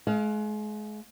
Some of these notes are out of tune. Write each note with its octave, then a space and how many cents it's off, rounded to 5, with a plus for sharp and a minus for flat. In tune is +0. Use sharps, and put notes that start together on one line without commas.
G#3 +35 F5 +0